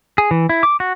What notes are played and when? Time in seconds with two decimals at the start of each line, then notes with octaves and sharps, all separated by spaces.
0.18 G#4
0.31 E3
0.49 E4
0.63 D6
0.80 F#4